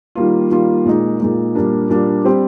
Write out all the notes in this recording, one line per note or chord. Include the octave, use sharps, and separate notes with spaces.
D#3 G3 A#3 F4
D#3 G3 A#3 F4
A#2 G#3 D#4
A#2 G#3 D#4
A#2 G3 A#3 D4
A#2 G3 A#3 D4
G3 C4 G4